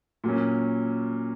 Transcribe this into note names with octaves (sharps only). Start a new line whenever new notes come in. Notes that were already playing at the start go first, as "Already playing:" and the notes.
A#2 F#3 C#4